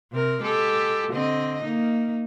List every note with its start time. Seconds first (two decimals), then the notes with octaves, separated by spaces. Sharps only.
0.12 C3 C4 A#4
0.41 G#3 G4 A4
1.11 D3 C4 D#5
1.63 A#3 D#4